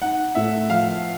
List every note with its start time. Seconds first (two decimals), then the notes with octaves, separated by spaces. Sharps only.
0.01 D#4 F#5
0.35 A2 E5
0.70 F3 F5